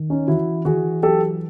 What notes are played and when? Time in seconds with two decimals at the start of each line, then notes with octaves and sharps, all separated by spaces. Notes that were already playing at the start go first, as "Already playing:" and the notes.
Already playing: D#3
0.10 C#4 D#4
0.28 E3 E4 F#4
0.65 E3 F#4 G#4
1.02 F#3 G4 A4